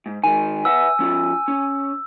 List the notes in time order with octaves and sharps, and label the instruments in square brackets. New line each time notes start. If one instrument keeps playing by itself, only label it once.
[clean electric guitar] G#2
[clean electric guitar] D#3 G#3 [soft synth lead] G#5
[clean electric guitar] B4 E5 F#5 [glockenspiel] E6
[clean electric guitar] F3 C#4 F4
C#4 C#5